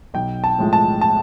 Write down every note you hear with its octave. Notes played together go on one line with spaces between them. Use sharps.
B1 G5
A5
A2 F3 G#3
A5
A5